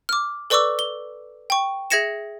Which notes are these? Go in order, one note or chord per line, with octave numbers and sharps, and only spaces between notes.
D6 F6
A4 B4 D5 C#6 D6 E6
G7
G5 C#6
G#4 E5 G#6 A#6 C#7 E7